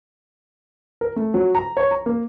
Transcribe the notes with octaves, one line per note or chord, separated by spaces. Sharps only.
A#4
A3
F#3
A#5
C#5
A#5
A#3